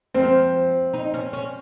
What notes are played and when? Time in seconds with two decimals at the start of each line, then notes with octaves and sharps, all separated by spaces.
0.14 F3 C4
0.93 D#4
1.14 C#4
1.33 C#4